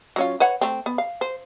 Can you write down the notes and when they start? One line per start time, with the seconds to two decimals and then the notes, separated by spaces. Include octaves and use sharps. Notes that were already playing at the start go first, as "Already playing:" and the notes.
0.16 F#3 C#4 F4
0.40 B4 C#5 F#5
0.61 A3 C4
0.86 B3
0.98 F5
1.21 C5